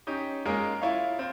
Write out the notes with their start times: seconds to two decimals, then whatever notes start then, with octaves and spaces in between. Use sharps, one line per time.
0.07 C#4 D#4 G4
0.45 G#3 A#3 C#4 F4 G#4 A#4
0.82 E4 F4 C#5 F5
1.19 C4 F4 C5